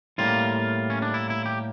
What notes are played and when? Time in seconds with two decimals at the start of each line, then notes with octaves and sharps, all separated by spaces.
0.18 A2 G3 A#3 F4
0.90 C#4
1.02 D4
1.14 E4
1.30 E4
1.46 G4